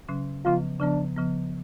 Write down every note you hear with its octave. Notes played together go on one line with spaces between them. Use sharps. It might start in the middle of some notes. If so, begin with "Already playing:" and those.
C#3 F#3 C#4
C#3 F3 B3 F4
C#3 F3 B3 D4
C#3 F3 B3